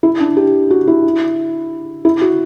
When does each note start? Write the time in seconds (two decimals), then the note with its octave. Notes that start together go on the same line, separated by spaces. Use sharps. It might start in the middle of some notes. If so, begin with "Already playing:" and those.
0.03 E4
0.20 D4
0.37 G4
0.70 F#4
0.88 E4
2.05 E4
2.21 F#4